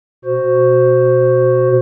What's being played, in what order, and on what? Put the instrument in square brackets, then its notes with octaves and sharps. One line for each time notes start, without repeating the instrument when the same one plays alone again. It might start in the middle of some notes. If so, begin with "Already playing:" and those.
[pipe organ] B2 F#4 C5